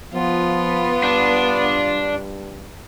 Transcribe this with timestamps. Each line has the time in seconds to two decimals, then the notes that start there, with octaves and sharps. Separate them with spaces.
0.14 F3 B3 F4
1.03 G2 D4